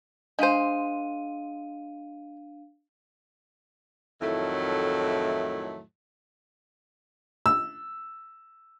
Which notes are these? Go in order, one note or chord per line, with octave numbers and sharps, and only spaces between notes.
G#3 D4 C5 F5 D#7
F2 A2 D#3 F#3 A3 E4
E6